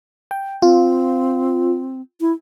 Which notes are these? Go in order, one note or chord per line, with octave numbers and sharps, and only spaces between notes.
G5
C4 F4
E4